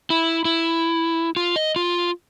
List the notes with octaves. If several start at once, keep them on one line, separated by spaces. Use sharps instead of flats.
E4
E4
F4
D#5
F4